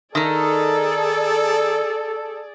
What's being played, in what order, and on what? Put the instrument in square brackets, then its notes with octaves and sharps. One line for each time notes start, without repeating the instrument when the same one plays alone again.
[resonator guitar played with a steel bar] D#3 D#4 [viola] G#4 D5 [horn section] A4